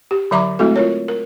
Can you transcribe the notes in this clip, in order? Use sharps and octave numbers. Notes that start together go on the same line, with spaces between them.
G4
D3 F#3 E5 A#5 D6
G#3 A3 C4 E4 F#4 A4
F4 A#4 C#5
A#4